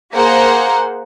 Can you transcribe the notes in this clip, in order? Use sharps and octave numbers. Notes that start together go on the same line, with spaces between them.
A#3 G#4 A#4 C5 F#5